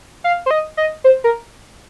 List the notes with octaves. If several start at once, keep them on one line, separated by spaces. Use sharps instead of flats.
F5
C5
D#5
D#5
C5
A#4